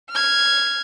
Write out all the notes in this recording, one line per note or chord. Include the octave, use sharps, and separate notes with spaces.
F6 G#6